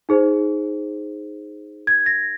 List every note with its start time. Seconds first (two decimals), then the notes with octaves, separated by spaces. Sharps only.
0.09 D#4 G#4 C5
1.87 G#6
2.06 A#6